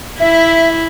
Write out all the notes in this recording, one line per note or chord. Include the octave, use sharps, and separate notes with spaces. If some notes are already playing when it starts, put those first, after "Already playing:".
E4 E5